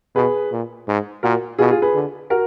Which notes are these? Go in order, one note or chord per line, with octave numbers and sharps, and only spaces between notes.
B2 G#4 B4
A#2
G#2
A#2 F#4 A#4
B2 F4 G#4
F4 G#4
G#4 B4
D3
F#4 A#4